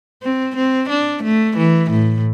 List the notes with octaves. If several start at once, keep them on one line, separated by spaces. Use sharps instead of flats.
C4
C4
D4
A3
E3
A2